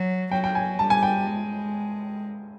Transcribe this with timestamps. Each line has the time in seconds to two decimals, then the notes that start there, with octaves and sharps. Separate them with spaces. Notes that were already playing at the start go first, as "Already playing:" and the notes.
Already playing: F#3
0.31 F#3 G5
0.44 G5
0.55 G#5
0.79 G3 A5
0.90 G#5
1.03 G5
1.26 G#3